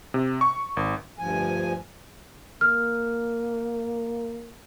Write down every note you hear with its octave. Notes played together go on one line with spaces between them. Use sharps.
C3
C#6
G#1
D2 G2 F3 G#5
A#3 F6